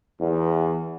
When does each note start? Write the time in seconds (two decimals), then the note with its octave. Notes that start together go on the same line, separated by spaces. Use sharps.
0.20 E2